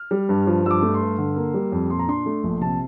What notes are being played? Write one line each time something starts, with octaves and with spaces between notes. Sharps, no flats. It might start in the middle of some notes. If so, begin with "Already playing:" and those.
Already playing: F6
G3
G2
F3
G2 E6
D6
A3
C6
G2
D3
A#3
G3
F2
A#2 C6
A#5
D4 C6
A3
A#1
C3 A5